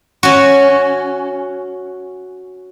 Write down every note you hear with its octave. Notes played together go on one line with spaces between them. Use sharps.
C#4 F#4